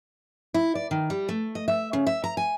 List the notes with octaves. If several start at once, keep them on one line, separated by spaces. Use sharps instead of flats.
E4
D5
D#3
G3
A3
D#5
E5
C#3
E5
A#5
G#5